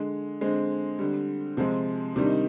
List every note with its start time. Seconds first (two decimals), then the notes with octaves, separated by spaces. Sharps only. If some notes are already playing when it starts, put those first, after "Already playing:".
Already playing: D3 G#3
0.41 D3 G#3 C4
0.99 D3 G3
1.57 C3 F3 G#3
2.16 C3 D#3 G3 D4
2.26 D#4